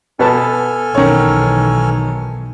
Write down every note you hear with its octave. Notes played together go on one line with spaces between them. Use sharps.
B2 B3 A4 G#5 A5 F6
B1 D#3 E3 C#5